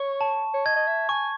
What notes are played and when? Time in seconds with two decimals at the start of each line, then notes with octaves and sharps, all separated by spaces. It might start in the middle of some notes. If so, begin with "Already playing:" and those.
Already playing: C#5 C#6
0.21 A5
0.54 C#5
0.65 D#5 G#6
0.76 D#5
0.87 E5
1.09 G#5 C#6